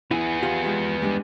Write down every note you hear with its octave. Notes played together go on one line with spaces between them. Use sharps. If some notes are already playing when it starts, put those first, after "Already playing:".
B3 E4 G#4
F4 G4 F5
G#3 F4 G4
G3 G#3 D4